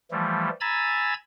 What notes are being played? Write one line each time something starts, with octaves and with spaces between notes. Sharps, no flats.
E3 F3 G3 A3
G#5 A#5 B5 E6 G#6 A6